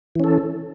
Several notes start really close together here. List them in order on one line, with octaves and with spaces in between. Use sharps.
E3 C#4 A4